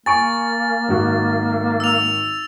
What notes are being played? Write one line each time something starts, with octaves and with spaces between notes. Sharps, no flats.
A#3 G#5 C#6 A6 D7
G#1 F#4
E6 F7